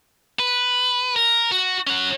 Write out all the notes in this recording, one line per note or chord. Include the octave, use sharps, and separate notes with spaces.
B4
A#4
F#4
C#4 F#5